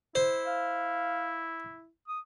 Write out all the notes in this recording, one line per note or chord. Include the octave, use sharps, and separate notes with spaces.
E4 C5
F5
D#6